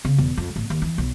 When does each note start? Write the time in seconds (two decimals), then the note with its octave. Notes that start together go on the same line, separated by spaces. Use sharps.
0.05 C#3
0.18 E1
0.37 F2
0.56 A1
0.70 D#2
0.82 E3
0.98 B1